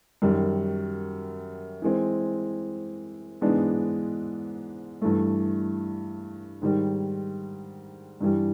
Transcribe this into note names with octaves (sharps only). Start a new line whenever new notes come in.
F#2 D#3 G3
E3 G#3 C4
G#2 E3 G#3 B3 D4
G2 E3 A3
G#2 D#3 G3
G2 E3 G3